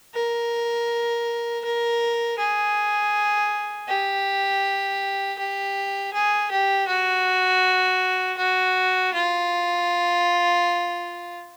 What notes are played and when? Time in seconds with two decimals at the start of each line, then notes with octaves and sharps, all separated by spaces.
0.15 A#4
1.65 A#4
2.38 G#4
3.88 G4
5.39 G4
6.14 G#4
6.52 G4
6.88 F#4
8.38 F#4
9.14 F4